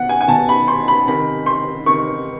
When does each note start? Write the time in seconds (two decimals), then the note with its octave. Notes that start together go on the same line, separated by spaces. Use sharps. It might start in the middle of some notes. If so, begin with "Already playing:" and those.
Already playing: B2 F#5
0.09 G#5
0.21 G#5
0.28 B2 A5
0.49 B5
0.68 C6
0.88 B5
1.07 C3 D#3 B5
1.46 C6
1.86 C3 D#3 C#6